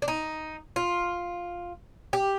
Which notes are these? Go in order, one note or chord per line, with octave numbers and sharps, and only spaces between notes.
D4
D#4
F4
G4